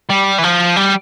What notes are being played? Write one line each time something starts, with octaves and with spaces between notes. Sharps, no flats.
G3
E3
F3
G3